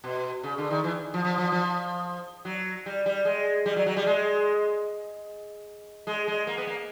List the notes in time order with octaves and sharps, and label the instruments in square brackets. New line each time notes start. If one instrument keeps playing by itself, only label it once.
[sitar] B2
C#3
D3
D#3
E3
F3
F3
F3
F3
F#3
G3
G3
G#3
G3
F#3
F#3
G3
G#3
G#3
G#3
A#3
B3
A#3